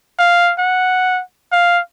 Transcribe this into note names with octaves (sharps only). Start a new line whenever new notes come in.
F5
F#5
F5